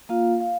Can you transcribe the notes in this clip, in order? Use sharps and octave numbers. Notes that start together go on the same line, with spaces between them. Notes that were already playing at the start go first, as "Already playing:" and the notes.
A#3 F4 F5
F5